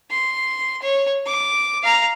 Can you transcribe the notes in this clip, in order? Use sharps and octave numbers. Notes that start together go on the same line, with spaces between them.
C6
C#5
D6
F5 A#5